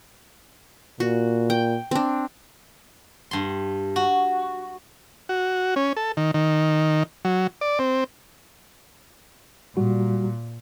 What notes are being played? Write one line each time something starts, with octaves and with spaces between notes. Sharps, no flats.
A#2 F#4
G5
C4 D4
G2 C6
F#4
F#4
C#4
A4
D#3
D#3
F#3
D5
C4
A#2 G3 F#4